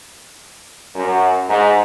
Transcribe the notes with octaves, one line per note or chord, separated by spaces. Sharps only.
F#2
G#2